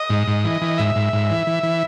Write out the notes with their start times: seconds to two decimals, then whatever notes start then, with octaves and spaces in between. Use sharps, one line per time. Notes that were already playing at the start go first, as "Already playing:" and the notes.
Already playing: D#5
0.10 G#2
0.27 G#2
0.44 E3
0.62 E3
0.78 G#2 E5
0.95 G#2
1.13 G#2
1.30 E3
1.47 E3
1.63 E3